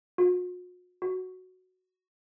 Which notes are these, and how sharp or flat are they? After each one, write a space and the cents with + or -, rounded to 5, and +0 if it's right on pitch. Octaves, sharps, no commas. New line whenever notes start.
F#4 -45
F#4 +0